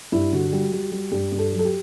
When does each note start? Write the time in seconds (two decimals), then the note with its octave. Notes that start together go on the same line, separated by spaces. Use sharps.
0.12 G2 E4
0.32 D3 F#4
0.52 G3
0.73 G3
0.92 G3
1.12 G2 G4
1.32 G2
1.39 A4
1.52 F#3
1.59 A4
1.65 G4